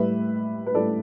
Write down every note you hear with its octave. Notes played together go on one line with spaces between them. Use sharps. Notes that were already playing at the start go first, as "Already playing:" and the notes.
Already playing: A2 G3 E4 B4 E5
B4
A2 G3 E4 A4 D5